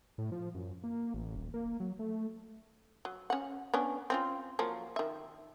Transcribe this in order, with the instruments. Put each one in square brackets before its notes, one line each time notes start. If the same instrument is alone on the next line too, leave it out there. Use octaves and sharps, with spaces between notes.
[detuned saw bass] A2
F3
F#2
A#3
A1
D#1
A#3
F#3
A3
[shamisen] F#3
C#4 F#5
B3 C#4 D4
C4 C#4 F4
F3 F#3 A#3
D#3 E5